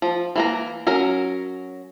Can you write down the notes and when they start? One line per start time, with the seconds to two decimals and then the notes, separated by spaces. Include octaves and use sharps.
0.02 F3
0.36 E3 A#3 A#5
0.87 F#3 C#4 A#4